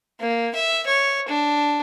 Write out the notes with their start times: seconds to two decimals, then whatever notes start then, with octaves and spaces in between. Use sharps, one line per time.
0.20 A#3
0.55 E5
0.86 C#5
1.28 D4